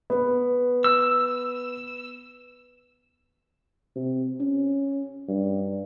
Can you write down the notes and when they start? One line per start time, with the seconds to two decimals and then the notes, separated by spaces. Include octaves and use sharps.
0.10 B3
0.84 E6
3.95 C3
4.40 C#4
5.28 G2